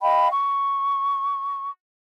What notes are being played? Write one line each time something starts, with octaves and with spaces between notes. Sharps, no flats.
D#5 F5 G5 B5
C#6